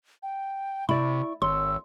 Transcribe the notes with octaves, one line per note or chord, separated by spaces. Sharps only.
G5
C3 E4 D5 B5 C#6
G#1 C#5 C6 E6